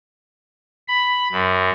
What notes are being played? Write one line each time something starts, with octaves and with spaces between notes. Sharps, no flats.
B5
F#2